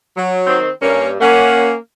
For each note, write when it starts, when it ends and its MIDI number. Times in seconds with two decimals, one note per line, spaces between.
0.17 0.58 54
0.47 0.68 51
0.47 0.68 60
0.81 1.17 43
0.81 1.09 58
0.81 1.09 61
1.20 1.75 58
1.20 1.70 61
1.20 1.70 78